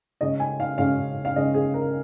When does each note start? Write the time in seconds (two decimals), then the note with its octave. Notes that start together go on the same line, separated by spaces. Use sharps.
0.21 C#3 G#3 C#4 D#5
0.40 G#5
0.60 F5
0.78 C#3 G#3 C#4 F5
1.25 F5
1.36 C#3 G#3 C#4 D#5
1.54 G#4
1.74 A#4